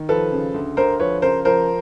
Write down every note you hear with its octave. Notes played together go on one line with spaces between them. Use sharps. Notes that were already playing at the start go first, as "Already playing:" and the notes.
Already playing: D#3
F3 A4 B4
C#3
D2
D2 A#4 C5
F3 B4 C#5
C#3 A#4 C5
F3 A#4 C5